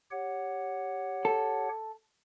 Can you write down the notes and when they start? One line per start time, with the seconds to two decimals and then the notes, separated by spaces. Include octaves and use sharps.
0.11 G4 C#5 F#5
1.25 A4